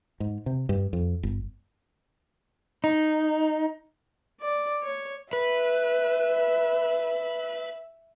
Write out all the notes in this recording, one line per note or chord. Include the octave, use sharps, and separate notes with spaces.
G#2
C3
G2
F2
G1
D#4
D5
C#5
B4 E5